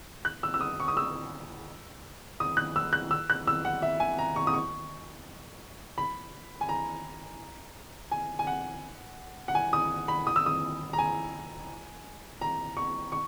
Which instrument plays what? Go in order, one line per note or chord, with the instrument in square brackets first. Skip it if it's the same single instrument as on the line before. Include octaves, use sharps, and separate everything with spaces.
[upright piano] F#6
E6
E6
D#6
C#6
D#6
E6
D#6
F#6
E6
F#6
E6
F#6
E6
F#5
E5
G#5
A#5
C#6
D#6
C#6
B5
G#5
A#5
G#5
G#5
F#5
F#5
G#5
D#6
B5
D#6
E6
D#6
A#5
G#5
A#5
C#6
C#6